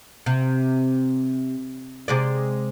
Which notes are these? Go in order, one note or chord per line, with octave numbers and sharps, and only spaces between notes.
C3
C3 G#3 D5